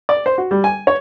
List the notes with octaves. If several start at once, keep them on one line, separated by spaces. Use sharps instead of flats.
D5
C5
F#4
G3
G#5
C#5